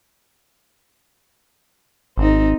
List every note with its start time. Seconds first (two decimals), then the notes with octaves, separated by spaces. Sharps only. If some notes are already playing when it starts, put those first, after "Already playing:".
2.18 G#1 C4 D#4